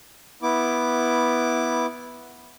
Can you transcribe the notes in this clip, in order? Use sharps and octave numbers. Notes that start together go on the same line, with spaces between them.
B3 E4 D6